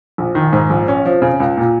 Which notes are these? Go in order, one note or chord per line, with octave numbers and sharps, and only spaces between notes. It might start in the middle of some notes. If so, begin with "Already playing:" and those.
A#1
D#3
G#2
A#1
C#4
F3
C#3
C#2
A#2